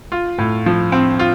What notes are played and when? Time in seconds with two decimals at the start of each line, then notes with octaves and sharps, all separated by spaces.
0.12 F4
0.38 A2
0.66 F3
0.92 C4
1.19 F4